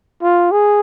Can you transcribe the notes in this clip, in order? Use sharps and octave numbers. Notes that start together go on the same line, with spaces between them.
F4
G#4